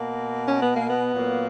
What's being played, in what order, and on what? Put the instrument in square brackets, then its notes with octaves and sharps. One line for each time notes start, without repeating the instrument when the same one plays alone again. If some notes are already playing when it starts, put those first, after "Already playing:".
Already playing: [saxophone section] B2 A#3
C#4
B3
A#3
B3
A#2 F#3 A#3